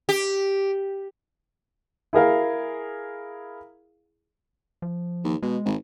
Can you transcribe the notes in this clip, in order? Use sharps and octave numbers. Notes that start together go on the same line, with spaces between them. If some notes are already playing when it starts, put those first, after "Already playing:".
G4
E4 G#4 A#4 F5
F3
D#2
B2 G#3
G#1